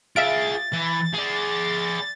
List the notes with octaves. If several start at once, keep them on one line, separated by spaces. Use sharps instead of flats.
F4 G#4 E5 F5 A6 D7
E3
G#4 D5